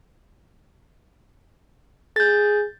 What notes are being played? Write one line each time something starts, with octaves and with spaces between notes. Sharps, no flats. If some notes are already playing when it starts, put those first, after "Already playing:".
G#4 G6 A6